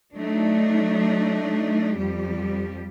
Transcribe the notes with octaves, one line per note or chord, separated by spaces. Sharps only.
F#3 A3 D4 D#4
F2 F3 G3 G4